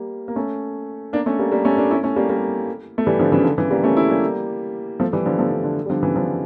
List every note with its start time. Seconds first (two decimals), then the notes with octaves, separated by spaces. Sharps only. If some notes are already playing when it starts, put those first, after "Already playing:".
Already playing: G3 A#3
0.28 A#3
0.36 A3 C#4
1.13 A#3 D4
1.26 A3 C#4
1.39 G3 A#3
1.52 G3 A#3
1.65 A3 C#4
1.77 A#3 D4
1.91 C#4 E4
2.03 A3 C#4
2.16 G3 A#3
2.29 G3 A#3
2.98 A3
3.07 E3 G3
3.19 D3 F3
3.32 C#3 E3
3.45 D3
3.58 C#3 E3
3.71 G3 A#3
3.84 A3 C#4
3.97 C#4 E4
4.10 G3 A#3
5.00 F3 A3
5.13 E3 G3
5.25 D3 F3
5.39 F3 A3
5.51 D3
5.64 D3
5.86 G3
5.90 D3 F3
6.03 C#3 E3
6.16 D3 F3